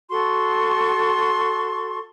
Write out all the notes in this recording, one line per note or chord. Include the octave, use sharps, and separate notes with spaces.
F#4 A4 C6 C#6